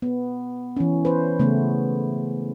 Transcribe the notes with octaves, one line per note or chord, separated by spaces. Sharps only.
B3
E3 C#4
B4 C5
C#3 A3 B3